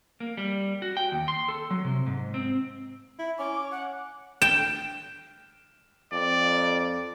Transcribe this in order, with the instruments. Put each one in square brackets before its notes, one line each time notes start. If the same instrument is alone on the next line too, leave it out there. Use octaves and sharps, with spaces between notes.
[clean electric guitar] A#3
G3
F#4
G5
D#2
C6
A4
F#3
C3
G#2
C4
[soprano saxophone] E4
[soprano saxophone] C#4 [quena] D6
[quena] F#5
[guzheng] G5 [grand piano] E7
[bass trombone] F2 [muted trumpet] D5